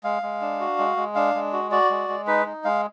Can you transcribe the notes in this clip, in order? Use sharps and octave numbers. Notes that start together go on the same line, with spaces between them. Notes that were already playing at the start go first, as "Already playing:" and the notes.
G#3 F5
G#3
D4
F#4
G#3
G#3
D4 F5
G#3
F#4
F#4 D5
G#3
G#3
D#4 B4
D#4
G#3 F5